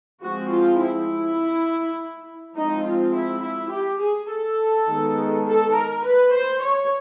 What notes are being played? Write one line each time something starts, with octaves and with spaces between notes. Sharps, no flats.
F3 G#3 C4 F#4
F4
E4
F3 G#3 C4 D#4
F4
E4
E4
G4
G#4
A4
D#3 G#3 B3
A4
A#4
B4
C5
C#5